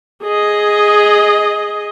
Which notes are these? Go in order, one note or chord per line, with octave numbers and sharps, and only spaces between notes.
G#4 D#5